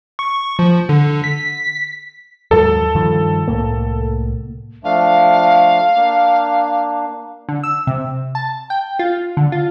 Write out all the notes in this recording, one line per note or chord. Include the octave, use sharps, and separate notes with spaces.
C#6
F3
D3
B6
D#2 G#2 F#3 A4
G2 D#3 F3
C2 A2 A#3
F3 A3 D4 F5
A#3 D4
D3
E6
C3
A5
G5
F4
D3
F4